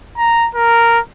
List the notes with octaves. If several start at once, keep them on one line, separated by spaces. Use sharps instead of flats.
A#5
A#4